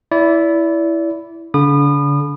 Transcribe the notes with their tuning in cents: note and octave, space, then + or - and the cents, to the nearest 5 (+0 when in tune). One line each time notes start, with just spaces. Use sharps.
E4 +0 D5 -30
D3 -40 B5 +0 D#6 -35